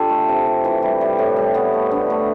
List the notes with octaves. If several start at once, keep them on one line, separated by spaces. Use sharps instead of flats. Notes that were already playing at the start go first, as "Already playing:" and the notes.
Already playing: D3 D4 F4 G4 A4
A3
C3
C3
E3
G3
G3
A2
G3
A3 B3
A3
D3
A3